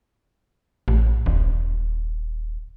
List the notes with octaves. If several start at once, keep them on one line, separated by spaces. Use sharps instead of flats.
A1
D#1